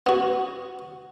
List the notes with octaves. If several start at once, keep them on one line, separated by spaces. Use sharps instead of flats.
B3 F#4